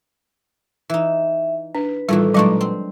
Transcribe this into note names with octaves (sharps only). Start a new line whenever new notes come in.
E3 D#4 E5
D4 B4
A2 D#3 E3 G3 F4
A#2 F#3 G#3 D4 D#5 C#6
C4